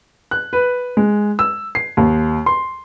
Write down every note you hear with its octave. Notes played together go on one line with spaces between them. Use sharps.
F#6
B4
G#3
E6
C7
D#2
C6